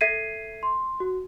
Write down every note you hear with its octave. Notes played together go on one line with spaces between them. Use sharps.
A4 E5 G#6 B6 C7 D#7
C6
F#4